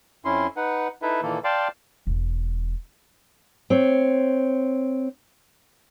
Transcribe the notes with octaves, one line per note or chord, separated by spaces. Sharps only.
F2 C#4 E4 C6
D#4 B4 F#5
D#4 E4 A4 B4 E5
A#2 D#3 E3 A#3 A4
D5 F5 G5 A5 C6 D6
E1
C4 C#5